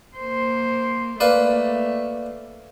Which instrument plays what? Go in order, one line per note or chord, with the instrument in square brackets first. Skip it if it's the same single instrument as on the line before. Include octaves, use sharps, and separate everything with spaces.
[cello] A#3 C5
[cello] A3 [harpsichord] A#3 B4 D5